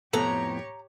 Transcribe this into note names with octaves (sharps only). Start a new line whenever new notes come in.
F2 A2 B3 G4 A4 C#5 A#5